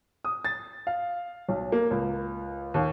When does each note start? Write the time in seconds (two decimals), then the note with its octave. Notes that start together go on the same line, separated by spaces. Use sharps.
0.25 D#6
0.45 A6
0.87 F5
1.49 B1
1.72 A#3
1.91 C#2
2.74 D#2